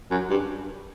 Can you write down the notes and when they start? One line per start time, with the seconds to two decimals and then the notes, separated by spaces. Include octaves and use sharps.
0.11 F#2
0.30 G2